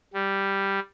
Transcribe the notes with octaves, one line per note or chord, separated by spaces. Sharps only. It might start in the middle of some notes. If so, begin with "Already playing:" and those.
G3